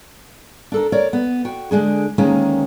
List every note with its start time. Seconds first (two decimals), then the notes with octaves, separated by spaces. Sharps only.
0.72 D4 A4 A#4
0.92 A#4 C#5 D5
1.13 B3
1.45 F#4 G5
1.71 D3 G#3 D4 G#4
2.18 D2 D#3 G#3 A#3 C#4